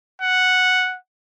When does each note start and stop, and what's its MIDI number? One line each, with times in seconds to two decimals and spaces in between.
0.22 0.96 78